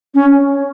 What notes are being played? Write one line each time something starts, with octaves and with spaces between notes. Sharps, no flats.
C#4